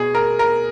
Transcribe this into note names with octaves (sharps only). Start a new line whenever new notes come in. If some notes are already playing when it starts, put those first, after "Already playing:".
Already playing: B2 G#4
A#4
A#4